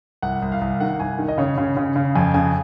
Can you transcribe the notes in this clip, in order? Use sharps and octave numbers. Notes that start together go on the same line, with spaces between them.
C2 F#5
C2
F5
C2
D#3 F#5
C2 G#5
D#3
D#5
C#3 C#5
C#3
C#3
C#3 F5
F2 G#5
C#3 G#5